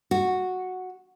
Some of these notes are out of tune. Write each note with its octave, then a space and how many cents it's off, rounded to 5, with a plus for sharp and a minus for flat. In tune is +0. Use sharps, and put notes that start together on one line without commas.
F#4 -5